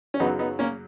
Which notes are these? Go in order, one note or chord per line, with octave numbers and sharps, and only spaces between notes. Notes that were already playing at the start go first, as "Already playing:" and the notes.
C#4
F#2 C#3 F#3 B3 D#4
B3 D#4
A#3 C#4